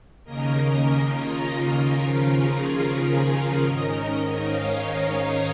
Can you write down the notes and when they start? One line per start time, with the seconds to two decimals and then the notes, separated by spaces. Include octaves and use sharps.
0.24 D#2 C#3 A#3 C#4 A#4 D#5
1.08 F4 A#4
1.92 D#2 C#3 F3 C#4
2.34 G#4
3.19 F4 A#4
3.60 G#2 D#3 C#4 A#4 D#5
4.44 C#5 F5